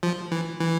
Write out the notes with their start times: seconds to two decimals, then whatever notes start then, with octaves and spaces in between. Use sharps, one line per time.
0.03 F3
0.32 E3
0.60 E3